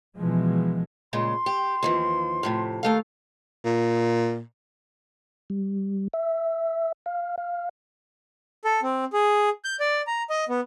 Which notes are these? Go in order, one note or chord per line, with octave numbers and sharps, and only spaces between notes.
B2 E3 F3 G#3
A#2 C#3 G#3 C6
G4
D#2 E3 F3
F2 A2 C3
D#2 A3 A4 F5
A#2
G3
E5
F5
F5
A4
C4
G#4
G6
D5
A#5
D#5
B3